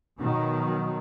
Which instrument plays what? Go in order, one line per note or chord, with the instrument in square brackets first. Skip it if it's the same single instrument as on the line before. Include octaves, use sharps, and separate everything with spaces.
[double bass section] B2 D#3 F#3